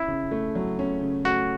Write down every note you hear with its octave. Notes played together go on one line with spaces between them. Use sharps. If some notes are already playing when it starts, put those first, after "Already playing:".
Already playing: C#4 E4
C#3
A3
F#3
C#4
C#3
A3 F#4